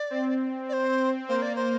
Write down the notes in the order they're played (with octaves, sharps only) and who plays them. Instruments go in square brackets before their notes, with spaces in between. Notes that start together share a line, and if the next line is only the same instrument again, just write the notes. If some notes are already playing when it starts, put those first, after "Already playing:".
Already playing: [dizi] D5
[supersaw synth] C4
[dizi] D5
C5
[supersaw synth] A#3 [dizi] C5
[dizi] D5
C5